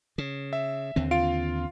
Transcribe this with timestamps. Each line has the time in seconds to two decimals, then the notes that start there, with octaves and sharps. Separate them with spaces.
0.18 C#3
0.53 E5
0.96 D#2 D3 C4
1.11 F4 F5 D7